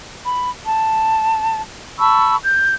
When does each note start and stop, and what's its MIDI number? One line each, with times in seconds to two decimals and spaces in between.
0.24 0.49 83
0.63 1.59 81
1.99 2.35 81
1.99 2.35 83
1.99 2.35 85
1.99 2.35 88
2.43 2.75 91